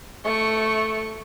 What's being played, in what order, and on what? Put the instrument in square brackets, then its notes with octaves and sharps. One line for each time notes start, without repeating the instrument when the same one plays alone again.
[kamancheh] A3 C#6